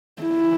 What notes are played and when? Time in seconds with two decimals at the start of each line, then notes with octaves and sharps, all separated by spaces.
0.22 E4